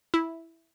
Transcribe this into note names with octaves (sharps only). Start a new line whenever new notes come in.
E4